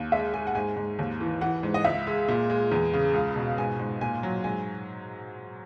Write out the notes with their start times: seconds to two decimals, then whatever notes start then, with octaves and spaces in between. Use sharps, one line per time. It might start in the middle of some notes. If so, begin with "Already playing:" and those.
Already playing: D#2
0.12 G#3 E5
0.34 G#3 G#5
0.47 F#5
0.55 G#2 G#5
0.76 G#2
0.99 D#2
1.20 E3
1.41 E3 F#5
1.63 G#2
1.74 D#5
1.84 C#2 E5
2.07 G#3
2.28 A#2
2.50 G#3
2.71 E2
2.93 C#3
3.14 C#2
3.36 B2
3.58 G#2 G#5
3.79 G#2
4.01 A#2 G#5
4.23 F#3
4.44 G#2 G#5